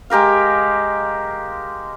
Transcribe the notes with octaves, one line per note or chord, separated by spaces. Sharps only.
G#3 G4 A#4 F5